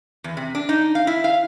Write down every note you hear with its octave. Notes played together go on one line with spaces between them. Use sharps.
E2
C3
D4
D#4
F5
E4
F5